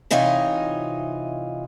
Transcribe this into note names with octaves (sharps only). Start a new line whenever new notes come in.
C3 E3 D#4 F4 C#5 D#5